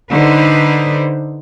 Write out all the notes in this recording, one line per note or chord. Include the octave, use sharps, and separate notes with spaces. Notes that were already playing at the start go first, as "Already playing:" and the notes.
D3 D#4 B4 C5